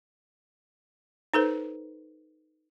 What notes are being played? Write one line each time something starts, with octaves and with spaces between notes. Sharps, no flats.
D#4 A4 B4 C5